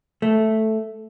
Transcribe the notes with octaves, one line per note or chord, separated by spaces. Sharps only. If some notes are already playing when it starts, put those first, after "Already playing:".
A3